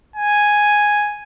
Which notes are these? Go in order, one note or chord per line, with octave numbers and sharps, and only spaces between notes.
G#5